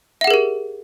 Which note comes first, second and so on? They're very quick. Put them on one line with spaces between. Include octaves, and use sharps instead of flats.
E5 F#5 G#4 A#4 G4